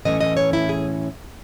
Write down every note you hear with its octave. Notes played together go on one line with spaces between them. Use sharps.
A2 E3 A3 C#4 D#5
D#5
C#5
E4
G#4